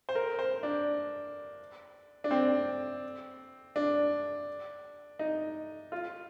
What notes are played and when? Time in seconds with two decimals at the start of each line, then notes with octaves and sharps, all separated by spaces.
0.09 C5
0.15 A#4
0.39 C5
0.63 D4
2.24 D4
2.31 C4
3.76 D4
5.19 D#4
5.92 F4